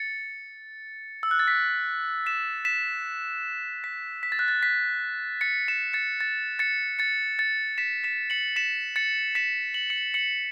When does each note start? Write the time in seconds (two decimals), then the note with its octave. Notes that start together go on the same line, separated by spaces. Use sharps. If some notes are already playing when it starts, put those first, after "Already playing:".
Already playing: A6 C#7
1.23 E6
1.31 F#6
1.39 A6
1.48 B6
2.26 B6 E7
2.65 B6 E7
3.84 B6
4.23 B6
4.32 A6
4.39 F#6
4.48 A6
4.63 B6
5.41 A6 C#7
5.68 B6 E7
5.93 A6 C#7
6.21 A6
6.59 A6 C#7
6.99 A6 C#7
7.39 A6 C#7
7.78 B6 E7
8.04 B6 E7
8.30 C#7 F#7
8.56 B6 E7
8.96 A6 C#7
9.35 B6 E7
9.74 F#7
9.90 C#7 F#7
10.14 C#7 F#7